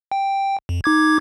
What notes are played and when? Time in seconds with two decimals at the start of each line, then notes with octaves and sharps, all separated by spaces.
0.12 G5
0.69 F2
0.84 D#4 D6 G#6